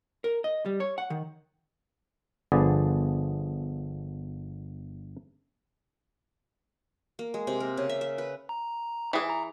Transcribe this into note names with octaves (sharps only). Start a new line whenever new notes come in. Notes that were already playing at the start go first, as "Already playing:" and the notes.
A#4
D#5
G3
C#5
F#5
D#3
G1 D3 F3 B3 G#4 D5
A#3
G#3
C3
A#4
C#3
E5
E5
B4
A#5
E3 G#4
A#5